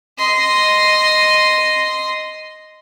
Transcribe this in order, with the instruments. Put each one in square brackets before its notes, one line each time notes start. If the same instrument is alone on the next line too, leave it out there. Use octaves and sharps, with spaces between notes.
[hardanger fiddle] D#5 C6